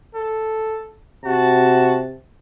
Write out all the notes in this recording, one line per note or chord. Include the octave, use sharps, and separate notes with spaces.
A4
C3 F#4 A5